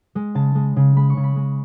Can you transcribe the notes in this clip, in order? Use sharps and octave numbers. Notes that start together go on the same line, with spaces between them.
G#3
C#3 A5
G#3
C#3
G#3 B5
C#6
C#3
B5
G#3